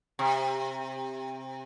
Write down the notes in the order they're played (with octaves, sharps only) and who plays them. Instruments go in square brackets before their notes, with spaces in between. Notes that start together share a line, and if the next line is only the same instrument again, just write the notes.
[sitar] C3